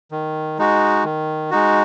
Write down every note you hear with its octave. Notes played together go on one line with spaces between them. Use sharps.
D#3
G#3 D#4 F#4
D#3
G#3 D#4 F#4